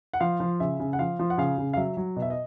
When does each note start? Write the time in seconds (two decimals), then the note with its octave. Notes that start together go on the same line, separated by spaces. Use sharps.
0.13 F#5
0.21 F3 F5
0.40 F3
0.60 C#3 E5
0.80 C#3
0.93 F#5
0.99 F3 F5
1.19 F3
1.30 F#5
1.38 C#3 F5
1.58 C#3
1.73 F5
1.77 F#3 E5
1.97 F#3
2.16 B2
2.22 E5
2.30 D#5